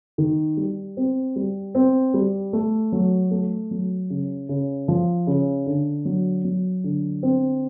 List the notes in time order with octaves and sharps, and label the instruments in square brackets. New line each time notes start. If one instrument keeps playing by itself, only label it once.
[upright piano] D#3
G3
C4
G3
C4
G3
A3
F#3
A3
F#3
C#3
C#3
F3
C#3
D3
F#3
F#3
D3
C4